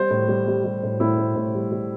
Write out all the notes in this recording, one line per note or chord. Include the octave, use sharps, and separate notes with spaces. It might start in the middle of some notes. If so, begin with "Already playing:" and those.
Already playing: G3 C5
A2
G3
G3
G3
A2
A2 E4
A2
A2
G3
G3